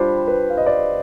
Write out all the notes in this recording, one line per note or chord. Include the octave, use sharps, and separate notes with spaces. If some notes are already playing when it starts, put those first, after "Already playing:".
Already playing: G3 D4 F4 C5 B5
B4
F5
D#5
D5